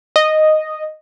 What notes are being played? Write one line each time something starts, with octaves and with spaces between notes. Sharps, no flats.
D#5